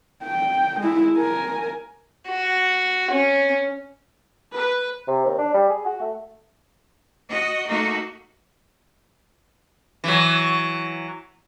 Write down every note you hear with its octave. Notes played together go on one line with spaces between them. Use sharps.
G5
G#3 E4
A#4 G#5
F#4
C#4
B4
C3
D#2
D4
G3
G#4
F#4
A3
F#4 D#5
A3 A#3 D#4 F#4
E3 F#3